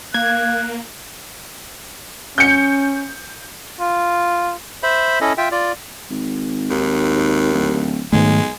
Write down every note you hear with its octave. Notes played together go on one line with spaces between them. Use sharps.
A#3 F5 F#6 G#6
C#4 G6 C#7
F4
C5 E5 B5
C#4 E4 A4 D#5
F4 E5 G5
F4 D5
G#1
D#2
D1
B1 G#2 D#3 G#3 A3